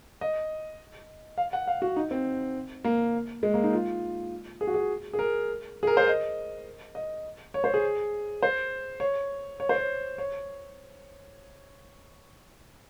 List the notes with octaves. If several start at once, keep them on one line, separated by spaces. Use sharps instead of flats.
D#5
F5
F#5
F5
F#4
D#4
C4
A#3
G#3
A#3
D#4
F4
G#4
F#4
G#4
G#4
A#4
G#4
A#4
C5
D#5
D#5
C#5
C5
G#4
C5
C#5
C#5
C5
C#5
C#5